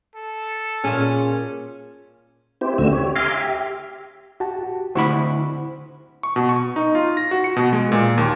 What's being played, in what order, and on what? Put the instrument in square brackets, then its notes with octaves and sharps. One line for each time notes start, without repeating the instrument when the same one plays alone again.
[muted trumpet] A4
[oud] A#2 F4 [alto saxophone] C#4 [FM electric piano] G#4
[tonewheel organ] C4 E4 G4 C5
D2 C#3 A3 D4 F#4 E6
G4 C#5
E5 F5 G#5 A#5 C6 D6
G4 E5
[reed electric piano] F#4 G4 A5
F#4 G4
[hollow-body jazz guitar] D2 E4 B5 [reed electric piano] C5 F#5 C#6
[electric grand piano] C#6
B2
C#6
D#4
F4
A#6
F#4
C#7
B2
G#3
A#2
D#2